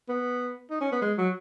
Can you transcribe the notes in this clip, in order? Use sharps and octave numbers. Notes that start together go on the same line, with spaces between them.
B3
D#4
C#4
B3
G#3
F#3